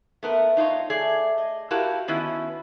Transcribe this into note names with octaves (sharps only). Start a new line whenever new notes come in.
A3 B3 A#4
D#4 F4 B4 C#5
A3 G#4 D5
D#5
E4 F#4 G4 A#4 F5 A5
D#3 B3 C#4 E4 F#4